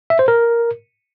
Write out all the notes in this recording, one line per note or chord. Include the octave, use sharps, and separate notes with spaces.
E5
C5
A#4